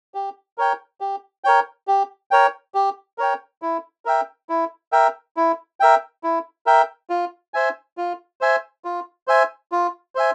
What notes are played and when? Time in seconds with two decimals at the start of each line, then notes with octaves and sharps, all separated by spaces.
0.14 G4
0.58 A#4 C#5 G5
1.01 G4
1.44 A#4 C#5 G5
1.88 G4
2.31 A#4 C#5 G5
2.74 G4
3.18 A#4 C#5 G5
3.62 E4
4.05 A#4 E5 G5
4.49 E4
4.92 A#4 E5 G5
5.37 E4
5.80 A#4 E5 G5
6.24 E4
6.66 A#4 E5 G5
7.10 F4
7.54 C5 E5 G#5
7.97 F4
8.41 C5 E5 G#5
8.85 F4
9.28 C5 E5 G#5
9.72 F4
10.15 C5 E5 G#5